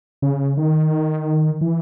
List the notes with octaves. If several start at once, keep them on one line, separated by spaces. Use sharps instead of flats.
C#3
D#3
E3